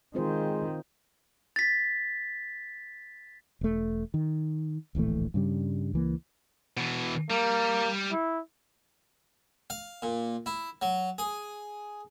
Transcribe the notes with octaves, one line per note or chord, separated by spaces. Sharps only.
D#3 G#3 C4 F4 C5
A6 B6
E1 A3
D#3
D1 A#1 E3 A3
G2 C#3 G3
C#2 E3 A#3
B2 E3
G3 A#3
E4
F5
A#2
E4
F#3
G#4